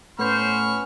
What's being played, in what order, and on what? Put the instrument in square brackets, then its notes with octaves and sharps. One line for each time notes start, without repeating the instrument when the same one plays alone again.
[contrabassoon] A2 [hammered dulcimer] B3 C#4 [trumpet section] C5 [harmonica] B5 C#6 F6